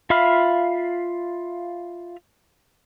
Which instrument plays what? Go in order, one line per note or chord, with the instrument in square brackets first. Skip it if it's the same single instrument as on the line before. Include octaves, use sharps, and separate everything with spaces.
[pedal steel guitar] F4 E5 F5 B5 F6